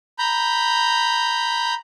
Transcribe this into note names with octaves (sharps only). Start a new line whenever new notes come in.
A#5 B5 G6